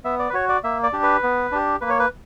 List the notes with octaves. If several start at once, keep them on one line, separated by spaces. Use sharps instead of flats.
B3 E5
D5
B4
F#4 C#5
D5
A#3 E5
D5
D4 G4
B4
B3
D4 G4
A#3 B4
C#5
B4